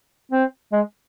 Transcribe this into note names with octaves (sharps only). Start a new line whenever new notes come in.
C4
G#3